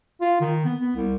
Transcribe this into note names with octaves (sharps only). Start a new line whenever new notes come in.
F4
D#3
B3
B3
C2